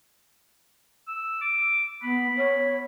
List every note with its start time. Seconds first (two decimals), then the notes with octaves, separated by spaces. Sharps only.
1.07 E6
1.41 D6
2.03 B3 B5
2.37 C#5